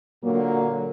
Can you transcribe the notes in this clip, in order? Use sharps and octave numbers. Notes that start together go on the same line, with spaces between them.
A#2 D3 F#3 A#3